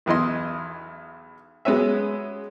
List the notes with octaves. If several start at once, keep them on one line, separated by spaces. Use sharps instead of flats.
B1 E2 E4 D#5 C6
F#3 G#3 B3 C#4 E5